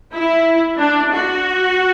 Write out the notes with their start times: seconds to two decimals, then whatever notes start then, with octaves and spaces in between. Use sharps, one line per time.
0.14 E4
0.78 D4
1.12 F#4